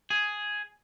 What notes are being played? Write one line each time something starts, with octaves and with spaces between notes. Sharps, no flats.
G#4